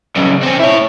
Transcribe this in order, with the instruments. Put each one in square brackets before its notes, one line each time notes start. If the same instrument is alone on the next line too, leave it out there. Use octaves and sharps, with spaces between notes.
[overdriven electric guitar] B1 C#3
C4 C#4
E4 C#5